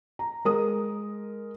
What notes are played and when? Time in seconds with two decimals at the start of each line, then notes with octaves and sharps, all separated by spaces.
0.19 A#5
0.45 G#3 A#4 D#6